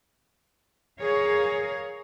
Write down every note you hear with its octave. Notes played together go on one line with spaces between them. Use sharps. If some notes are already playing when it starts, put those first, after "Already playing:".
G#4 A#4 C#5 F5